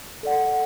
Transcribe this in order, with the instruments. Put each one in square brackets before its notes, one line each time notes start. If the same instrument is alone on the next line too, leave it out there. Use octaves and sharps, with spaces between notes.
[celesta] A4 D5 F#5